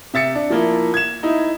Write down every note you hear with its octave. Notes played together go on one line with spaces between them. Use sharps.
C3 E5 A6 C#7
D4
F3 A#3 E4
G#6 E7
D#4 E4